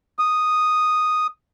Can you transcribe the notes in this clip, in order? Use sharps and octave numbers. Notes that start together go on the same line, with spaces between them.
D#6